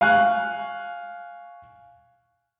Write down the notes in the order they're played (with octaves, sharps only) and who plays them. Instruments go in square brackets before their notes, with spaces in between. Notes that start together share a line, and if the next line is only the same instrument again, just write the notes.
[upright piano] F5 G#5 C#6 F#6